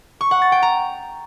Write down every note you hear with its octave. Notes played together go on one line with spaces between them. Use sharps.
C#6
F#5
A6
G5
A#5